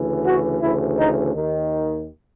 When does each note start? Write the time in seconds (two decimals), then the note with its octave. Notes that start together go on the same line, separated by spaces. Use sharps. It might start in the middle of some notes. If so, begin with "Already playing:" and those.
Already playing: D2 C#3 E3
0.25 F#4
0.62 D2 C#3 E3 E4
0.98 D#4
1.34 D#2 D#3